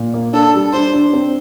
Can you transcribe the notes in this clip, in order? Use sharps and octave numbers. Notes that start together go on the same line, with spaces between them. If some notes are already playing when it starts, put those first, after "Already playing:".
Already playing: A#2
A#3
D4 A4
G3
D4 C5
D4
C4